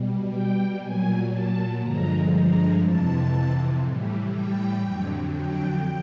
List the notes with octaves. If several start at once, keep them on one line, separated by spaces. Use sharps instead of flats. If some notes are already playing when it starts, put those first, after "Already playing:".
Already playing: B2 G3
G5
A#2 F#3 G#5
A5
G2 D3 F3 G#3 A#5
A#5
F2 C3 E3 A5
A2 E3 G3
G5
F2 D3 F#3
G5